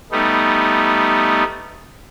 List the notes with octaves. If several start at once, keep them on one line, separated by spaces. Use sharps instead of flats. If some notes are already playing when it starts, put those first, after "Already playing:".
G3 A3 B3 D#4